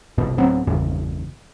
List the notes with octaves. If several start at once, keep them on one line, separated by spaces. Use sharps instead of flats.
G1 C2 G2 B2
D1 F#3 B3 C4
G#1 E2 G2 C#3